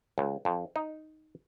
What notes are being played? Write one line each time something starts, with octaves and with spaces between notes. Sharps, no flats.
C#2
F2
D#4